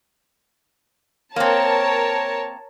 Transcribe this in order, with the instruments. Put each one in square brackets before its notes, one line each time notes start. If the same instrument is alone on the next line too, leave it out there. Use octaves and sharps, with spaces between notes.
[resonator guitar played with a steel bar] A#3 C4 [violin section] A#4 C#5 A5